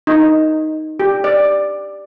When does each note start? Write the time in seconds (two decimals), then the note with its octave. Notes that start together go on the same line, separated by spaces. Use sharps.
0.07 D#4
1.00 G4
1.24 D5